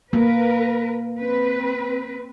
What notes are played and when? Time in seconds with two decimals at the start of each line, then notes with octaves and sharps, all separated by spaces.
0.13 A#3 A#4 B4
1.16 C4 B4